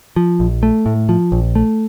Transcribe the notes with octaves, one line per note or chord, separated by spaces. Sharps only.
F3
A#1
A3
A2
F3
A#1
A3